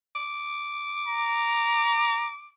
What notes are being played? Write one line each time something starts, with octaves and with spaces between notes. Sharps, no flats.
D6
A#5